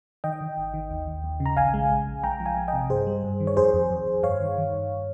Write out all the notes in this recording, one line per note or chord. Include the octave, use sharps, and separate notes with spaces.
D#3 D#5 G5
D#3
G#1
D#3
D#2
D#2
D#2
C#3
A#5
A#1 F5 G#5
G#3
A#1
A#1
G#3 G5 A#5
F3
F5 G#5
G#3
D#5 G5
C3
G2 G#4 C5
G3
G2
D#3
C#5
F2 G#4 C5
F2
F2
F2
G2 C#5 F5
D#3
D#3
G2